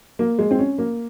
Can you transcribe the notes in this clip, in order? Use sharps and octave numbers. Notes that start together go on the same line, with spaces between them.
A#3
G#3
C4
C#4
A#3